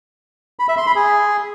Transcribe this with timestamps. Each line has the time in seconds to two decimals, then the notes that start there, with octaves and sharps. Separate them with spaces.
0.59 B5
0.68 E5
0.77 C6
0.87 B5
0.96 G#4